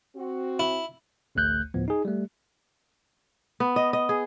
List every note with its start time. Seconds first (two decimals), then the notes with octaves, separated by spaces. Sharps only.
0.15 C4 F#4
0.60 E4
1.35 A1 D2 A3 F#6 G6
1.74 D2 A2 F3 B3
1.88 D#4 G#4
2.05 G3 A3
3.60 B3
3.76 D#5
3.93 D#5
4.09 G#4